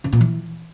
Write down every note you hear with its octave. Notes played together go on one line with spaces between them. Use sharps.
C#3
A#2
E3